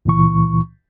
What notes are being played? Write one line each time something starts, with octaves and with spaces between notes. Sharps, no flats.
C#2 A#2 E3 C#6